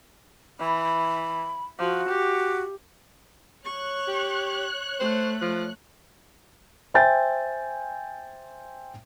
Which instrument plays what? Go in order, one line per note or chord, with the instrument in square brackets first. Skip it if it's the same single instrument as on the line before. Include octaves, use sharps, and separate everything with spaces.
[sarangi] E3 [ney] B5
[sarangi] F3 [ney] F#4
[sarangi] G4
[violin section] C#5 F#6 [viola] C#6
[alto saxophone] G4
[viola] A3 [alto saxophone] C5
[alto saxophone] F3
[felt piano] C5 E5 G5 G#5 G6 A6